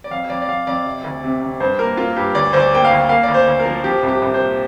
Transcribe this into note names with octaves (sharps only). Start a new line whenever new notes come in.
D5
F2 F5
F2 D5
D5
F2 F5
F2 D5
C3
D2
C3
C3
G2 C5
A#3 A#4
A#3 F4
G2 G4
D2 D5
D2 C5
D5
A#3 G5
F5
D2
A#3 F5
D2 D5
C5
D2
A#4
F3
F3 G4
C2
G4
C2
C5
A#2